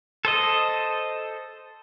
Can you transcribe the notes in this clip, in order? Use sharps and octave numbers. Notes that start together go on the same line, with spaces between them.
A4 C5 D#5